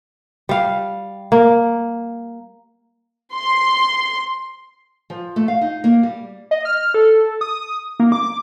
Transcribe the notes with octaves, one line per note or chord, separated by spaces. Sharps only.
G3 F5
A#3
C6
F3
A3
F5
D#4
A#3
G3
D#5
F6
A4
D#6
A#3
D6